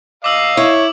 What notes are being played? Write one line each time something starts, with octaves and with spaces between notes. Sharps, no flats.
D#5 F5 D6 E6 F#7
E4 C#5